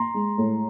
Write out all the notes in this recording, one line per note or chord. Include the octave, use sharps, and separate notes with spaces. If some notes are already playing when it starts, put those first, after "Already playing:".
Already playing: A#5 C6
G#3
A2